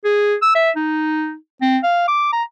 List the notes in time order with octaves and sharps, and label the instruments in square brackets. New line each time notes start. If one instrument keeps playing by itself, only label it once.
[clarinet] G#4
E6
E5
D#4
C4
F5
D6
A#5